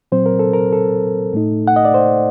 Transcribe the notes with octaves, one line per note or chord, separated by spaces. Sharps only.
A#2 F#3 C4 C5
A#4
A4
A#4
A4
A2 A3 D#4
F#5
D#5
D5
C5